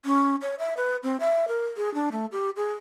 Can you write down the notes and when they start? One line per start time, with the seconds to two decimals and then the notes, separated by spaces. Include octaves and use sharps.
0.05 C#4
0.42 C#5
0.59 E5
0.77 B4
1.03 C4
1.20 E5
1.48 A#4
1.77 G#4
1.94 D4
2.12 A3
2.32 G4
2.56 G#4